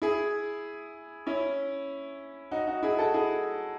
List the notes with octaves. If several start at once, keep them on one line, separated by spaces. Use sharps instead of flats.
E4 G#4
C#4 E4
D#4 F#4
D#4 F#4
E4 G#4
F#4 A4
E4 G#4